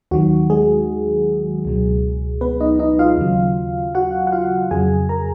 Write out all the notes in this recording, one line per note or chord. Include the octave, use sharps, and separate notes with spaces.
D#2 D#3 F#3 F#4
G#3 G#4
C#2 B2 F#3
B3 B4
D#4 D#5
D#4 D#5
F4 F5
D#2 C#3 F#3
F#4 F#5
F#5
F4 F5
F2 C#3 F#3 G#4 G#5
A#4 A#5